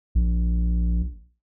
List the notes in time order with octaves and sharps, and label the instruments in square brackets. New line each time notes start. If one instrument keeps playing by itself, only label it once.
[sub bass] A#1